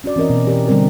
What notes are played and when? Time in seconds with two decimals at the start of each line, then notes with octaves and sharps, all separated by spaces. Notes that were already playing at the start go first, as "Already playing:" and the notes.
0.04 C#4 F#4 D5
0.16 E3 C4 C#4 A#4 D#5
0.30 B2
0.45 B2 E3 G4 A#4 D5
0.68 D3 G3 B3 C4 A#4